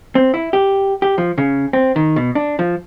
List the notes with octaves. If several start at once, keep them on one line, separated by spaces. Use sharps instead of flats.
C4
E4
G4
G4
F3
C#3
C4
D#3
B2
D4
F3